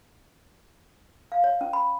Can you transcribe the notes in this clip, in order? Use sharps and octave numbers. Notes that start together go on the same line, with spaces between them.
F5
C#5
C#4
B5